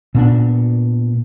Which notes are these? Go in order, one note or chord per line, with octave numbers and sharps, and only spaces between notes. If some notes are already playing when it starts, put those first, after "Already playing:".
A#2 B3 D4